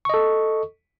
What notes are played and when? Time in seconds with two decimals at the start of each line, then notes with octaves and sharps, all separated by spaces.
0.05 C#6
0.09 D#5
0.14 A4